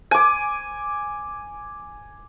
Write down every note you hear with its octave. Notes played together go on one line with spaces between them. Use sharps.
G#5 D6